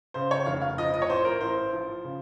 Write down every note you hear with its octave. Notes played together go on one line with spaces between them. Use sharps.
C#3 C5
C#5
F1 F5
F5
F3 D#5
D#5
C#5
A1 C5
A#4
A1 C5
F3
C#3